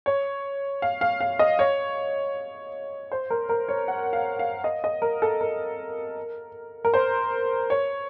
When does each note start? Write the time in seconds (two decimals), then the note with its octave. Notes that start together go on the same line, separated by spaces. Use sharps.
0.06 C#5
0.82 F5
1.01 F5
1.20 F5
1.39 D#5
1.59 C#5
3.12 C5
3.30 A#4
3.49 A#4
3.68 C#5
3.88 F#5
4.13 F5
4.39 F5
4.64 D#5
4.84 D#5
5.02 A#4
5.22 A4
5.41 A#4
6.85 A#4
6.94 C5
7.70 C#5